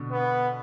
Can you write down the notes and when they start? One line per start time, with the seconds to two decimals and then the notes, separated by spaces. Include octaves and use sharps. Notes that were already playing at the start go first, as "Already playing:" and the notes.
Already playing: B2 D3
0.12 B3